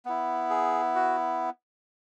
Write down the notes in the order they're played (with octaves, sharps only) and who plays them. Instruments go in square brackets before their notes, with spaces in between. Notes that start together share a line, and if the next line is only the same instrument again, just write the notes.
[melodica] B3 E4
G#4
F#4